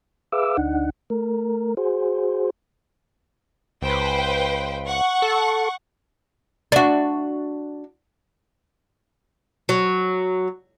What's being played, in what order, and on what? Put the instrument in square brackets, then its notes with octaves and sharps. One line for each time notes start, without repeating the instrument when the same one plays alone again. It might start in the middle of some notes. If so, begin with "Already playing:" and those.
[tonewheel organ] G#4 B4 E5 F5 D6 E6
D2 D4 D#4 F#5
A3 A#4
F#4 G#4 C5
[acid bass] C#2 [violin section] B4 C5 G5
[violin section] F#5 C#6
[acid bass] A4
[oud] D4 F#4
F#3